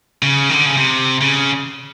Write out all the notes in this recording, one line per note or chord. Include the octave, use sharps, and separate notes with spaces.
C#3
D#3
D3
C#3
C3
C#3